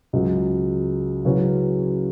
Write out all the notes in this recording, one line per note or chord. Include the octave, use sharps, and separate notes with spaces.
C#2 C#3 F#3
C#3 F#3 C#4 E4 B4